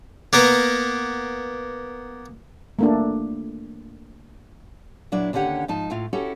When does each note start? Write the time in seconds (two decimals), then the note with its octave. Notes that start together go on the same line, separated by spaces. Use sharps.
0.33 A#3 B3 A#4
2.79 A3 A#3 D4
5.12 A#2 F#3 D4 E4
5.33 D#2 D3 C#4 G4 F#5
5.68 G#2 F3 D#4 A5
5.90 A2 A3 F4
6.13 C#4 E4 F#4 G4 A4